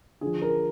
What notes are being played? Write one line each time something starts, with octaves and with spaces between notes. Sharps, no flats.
D3 F3 G#4
A#4